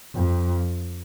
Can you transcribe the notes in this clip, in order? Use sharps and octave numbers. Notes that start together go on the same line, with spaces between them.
F2